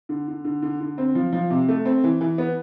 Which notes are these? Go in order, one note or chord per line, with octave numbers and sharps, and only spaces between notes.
D3
D3
D3
D3
D3
C4
F3
F3
C3
A3
C4
E3
E3
B3